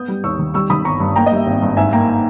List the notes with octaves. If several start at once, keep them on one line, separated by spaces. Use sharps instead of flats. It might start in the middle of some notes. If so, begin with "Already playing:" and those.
Already playing: B3 D#6 G6
G3
D#2 C#6 E6
D#3
G3 C#6 E6
D#3 B5 D#6
G1 A#5 C#6
G2
A#3 G5 A#5
D#5
G3 E5
G#1
G2
G#2 E5 G#5
A#3 G5 A#5